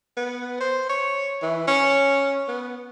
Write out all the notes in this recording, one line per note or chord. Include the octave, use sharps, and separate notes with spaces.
B3
C5
C#5
E3
C#4
B3